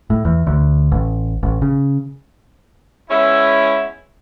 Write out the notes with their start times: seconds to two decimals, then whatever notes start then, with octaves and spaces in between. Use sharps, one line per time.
0.10 A2
0.25 E2
0.47 D2
0.92 A1
1.43 A1
1.62 C#3
3.11 G#3 B3 C#4 E4